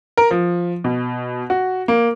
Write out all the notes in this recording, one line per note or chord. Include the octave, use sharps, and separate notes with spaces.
A#4
F3
B2
F#4
A#3